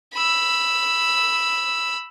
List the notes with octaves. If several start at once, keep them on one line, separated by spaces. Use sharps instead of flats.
B5 E6